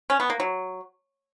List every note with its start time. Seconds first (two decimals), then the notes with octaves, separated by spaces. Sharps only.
0.10 C#4
0.20 B3
0.30 A#3
0.40 F#3